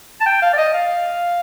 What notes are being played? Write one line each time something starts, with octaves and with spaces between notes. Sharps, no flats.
A5
G5
F5
D5
D#5
F5